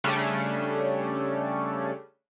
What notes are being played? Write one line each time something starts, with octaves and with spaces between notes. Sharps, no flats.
C#3 G3 A3 C#4 D4